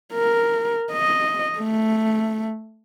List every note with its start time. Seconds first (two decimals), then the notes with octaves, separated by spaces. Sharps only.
0.13 A#4
0.92 D#5
1.59 A3